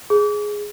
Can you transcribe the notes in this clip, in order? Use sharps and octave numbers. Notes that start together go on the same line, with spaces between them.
G#4